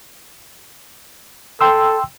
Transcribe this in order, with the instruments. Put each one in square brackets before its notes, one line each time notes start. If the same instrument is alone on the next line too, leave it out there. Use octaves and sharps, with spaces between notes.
[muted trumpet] A4 [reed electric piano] G5 C6 E6